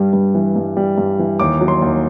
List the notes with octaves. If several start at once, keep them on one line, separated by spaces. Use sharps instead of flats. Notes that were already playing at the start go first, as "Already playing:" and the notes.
Already playing: G2 G3
G2
E3
G2
G3
G2
E3
D#2 D6
F#3
C6
D#2